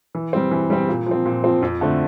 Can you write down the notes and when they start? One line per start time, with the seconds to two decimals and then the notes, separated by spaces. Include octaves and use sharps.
0.15 E3
0.33 G3 C4
0.51 E3
0.70 G3 C4
0.88 A#2
1.07 F3 C4
1.26 A#2
1.44 F3 C4
1.62 F2
1.81 D3 A3 C4